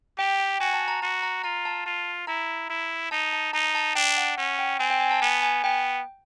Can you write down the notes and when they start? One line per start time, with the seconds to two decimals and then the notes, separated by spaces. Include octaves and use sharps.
0.18 G4 G5
0.40 G5
0.60 F#4 G#5
0.74 A5
0.88 A#5
1.02 F#4
1.23 A#5
1.44 F4 A#5
1.65 A5
1.86 F4
2.27 E4 A#5
2.70 E4
3.11 D#4 A5
3.33 A5
3.53 D#4 A#5
3.75 A5
3.95 D4 G5
4.17 F#5
4.37 C#4 F#5
4.59 G5
4.79 C4 G#5
4.90 G5
5.00 G#5
5.11 A5
5.22 B3 G#5
5.42 G#5
5.64 B3 G5